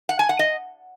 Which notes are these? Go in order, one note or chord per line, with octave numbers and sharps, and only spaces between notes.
F#5
G#5
F#5
D#5